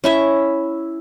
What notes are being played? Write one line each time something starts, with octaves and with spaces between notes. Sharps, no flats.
C#4 E4 E5